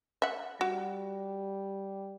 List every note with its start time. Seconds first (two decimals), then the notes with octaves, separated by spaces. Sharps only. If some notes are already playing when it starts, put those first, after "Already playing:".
0.22 E5 F#5
0.61 G3 F#4